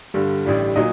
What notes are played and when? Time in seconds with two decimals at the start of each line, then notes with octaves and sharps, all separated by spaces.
0.14 G2 D3 G3
0.45 A1 A2 G3 D4
0.76 A#2 F#3 D#4 D#5